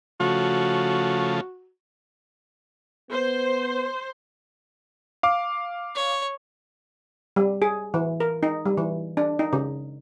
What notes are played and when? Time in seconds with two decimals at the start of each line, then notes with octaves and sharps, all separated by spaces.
0.20 C#3 F3 A3 F#4
3.10 B3 C5
5.23 F5 D6
5.95 C#5
7.36 G3
7.62 G#4
7.94 E3
8.20 A#4
8.43 D#4
8.66 G3
8.77 E3
9.17 D4
9.39 D#4
9.53 C#3